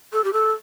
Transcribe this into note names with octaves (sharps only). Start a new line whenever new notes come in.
A4
G4
A4